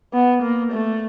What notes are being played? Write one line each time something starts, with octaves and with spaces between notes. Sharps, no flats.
B3
A#3
A3